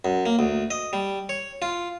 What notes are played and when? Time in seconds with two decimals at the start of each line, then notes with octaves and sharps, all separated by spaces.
0.05 F#2
0.26 A#3
0.39 D2
0.70 D#5
0.93 G3
1.29 C#5
1.62 F4